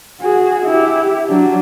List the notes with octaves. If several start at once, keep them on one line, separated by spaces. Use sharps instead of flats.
F#4 G#4
E4 G4
F#3 D4